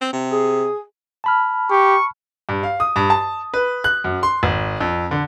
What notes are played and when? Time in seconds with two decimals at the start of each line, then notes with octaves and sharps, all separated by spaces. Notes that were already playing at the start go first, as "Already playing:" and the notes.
0.01 C4
0.13 C3
0.32 G#4
1.24 A5 B5 F6
1.70 G4 C#6
2.49 G2
2.63 F5
2.80 D#6
2.96 G2
3.10 A5
3.54 B4
3.84 F#6
4.04 F#2
4.23 C6
4.43 G#1
4.80 F2
5.11 D3